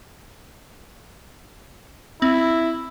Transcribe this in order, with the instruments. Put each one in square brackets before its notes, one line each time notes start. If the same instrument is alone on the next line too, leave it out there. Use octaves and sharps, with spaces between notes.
[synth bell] C4 [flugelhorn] E4